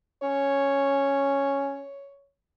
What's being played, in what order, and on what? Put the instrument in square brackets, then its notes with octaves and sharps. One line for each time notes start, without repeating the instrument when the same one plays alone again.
[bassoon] C#4 [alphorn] C#5